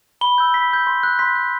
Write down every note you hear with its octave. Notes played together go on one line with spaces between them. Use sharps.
B5 G7
E6 G6
B5 B6
E6 G6
C6
F#6
C6 B6
F#6